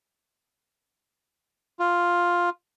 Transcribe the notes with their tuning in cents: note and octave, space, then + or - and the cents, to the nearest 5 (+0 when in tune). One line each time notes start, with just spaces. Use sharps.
F4 +5